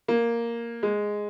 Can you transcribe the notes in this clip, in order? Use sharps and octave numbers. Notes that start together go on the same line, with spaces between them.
A#3
G#3